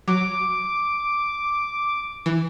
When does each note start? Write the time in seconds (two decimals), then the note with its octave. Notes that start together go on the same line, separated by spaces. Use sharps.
0.08 F#3 D6
2.26 E3